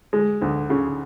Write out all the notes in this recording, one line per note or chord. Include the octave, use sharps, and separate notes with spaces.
G#3
D2
C#3